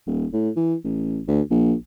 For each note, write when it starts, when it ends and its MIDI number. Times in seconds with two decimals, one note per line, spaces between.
0.07 0.26 27
0.33 0.50 45
0.57 0.75 52
0.84 1.20 33
1.28 1.42 38
1.51 1.74 34